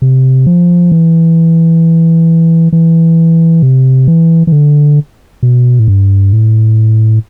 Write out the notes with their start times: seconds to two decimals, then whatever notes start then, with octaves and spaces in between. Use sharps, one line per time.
0.02 C3
0.46 F3
0.92 E3
2.73 E3
3.63 C3
4.07 E3
4.47 E3
4.52 D3
5.43 B2
5.79 A2
5.88 G2
6.33 A2